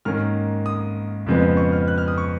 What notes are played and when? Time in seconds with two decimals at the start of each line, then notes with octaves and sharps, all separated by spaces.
0.05 G#2 D#3 A#3 C#4 F6
0.66 D#6
1.26 F2 C#3 F3 G#3 B3
1.57 C#6
1.72 F6
1.88 F#6
1.98 F6
2.08 D#6
2.18 C#6